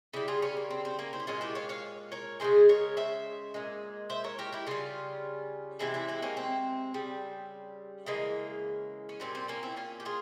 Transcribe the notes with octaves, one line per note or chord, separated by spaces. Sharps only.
C#3 G3 E4 G4
F4 G#4
C#4 F4
A#3
C4
C4
A#3 C#4
C4 E4
G4
A#2 G#3 C#4 F4
E4 G4
C#5 F5
C#5 F5
A#4 C#5
C#3 E3 G#3 G#4 C5
A#4 C#5
C5 E5
A#2 G#3
C5 E5
A#4 C#5
G4 A#4
E4 G4
C#3 G3 C#4 F4
C3 E3 G#3 C4 E4
C4 E4
C4 E4
A#3 C#4
C4
C#3 G3
C#3 E3 G#3 A#3
C#4
A#2 G3 C4
C4
A#3 C#4
C4 E4
C#4 F4
G4
F4 G#4